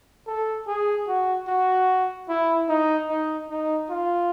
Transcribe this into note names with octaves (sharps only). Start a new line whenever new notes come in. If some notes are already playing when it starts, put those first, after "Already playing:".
A4
G#4
F#4
F#4
E4
D#4
D#4
D#4
F4